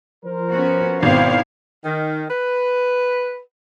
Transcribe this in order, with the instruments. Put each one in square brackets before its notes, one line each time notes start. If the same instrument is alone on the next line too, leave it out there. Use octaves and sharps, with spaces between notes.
[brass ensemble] F3 A#4 C5
[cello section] B3 C#4 F#4
[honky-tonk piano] G#1 [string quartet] B2 C4 [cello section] E4 F5
[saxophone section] D#3
B4